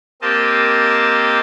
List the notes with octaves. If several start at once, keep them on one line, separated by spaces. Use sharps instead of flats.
A#3 C4 G4 D#5 A5